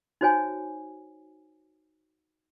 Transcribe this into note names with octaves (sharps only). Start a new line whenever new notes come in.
D#4 F#4 C5 C#5 G#5